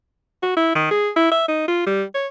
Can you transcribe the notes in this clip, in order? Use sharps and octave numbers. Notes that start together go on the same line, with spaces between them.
F#4
E4
D#3
G#4
E4
E5
D#4
F4
G3
C#5